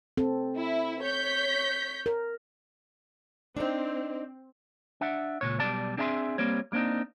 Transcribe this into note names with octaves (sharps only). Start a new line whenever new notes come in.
C4 A4
E4
C#5 G6 B6
A#4
C4 D4 D#4
D4 E5 F#5
C#2 A#2 C#5
B1 B2 G3 D5 A5
C4 D4 G#4 E5 G#5 C6
G3 A#3 C4 C#5
G3 A#3 C4 D4 D#4